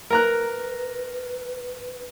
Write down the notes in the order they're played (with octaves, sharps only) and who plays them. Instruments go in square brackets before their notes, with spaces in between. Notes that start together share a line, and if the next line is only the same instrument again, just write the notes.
[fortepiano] A#4 A#5 F#6 [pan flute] B4